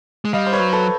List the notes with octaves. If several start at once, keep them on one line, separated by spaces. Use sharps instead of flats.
G#3
G3 D#5 F5
C5
B4 C#5
F#3
A4 B4